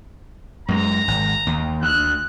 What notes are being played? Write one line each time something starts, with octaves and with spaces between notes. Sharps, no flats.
F#2 G#3 A#5
G#1
D#2
D2 F#6